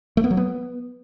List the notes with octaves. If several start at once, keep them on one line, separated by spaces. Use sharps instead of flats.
A3
B3
F#3
B3